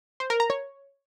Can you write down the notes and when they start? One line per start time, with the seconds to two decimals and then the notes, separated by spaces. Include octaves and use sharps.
0.20 C5
0.30 A#4
0.40 A#5
0.50 C#5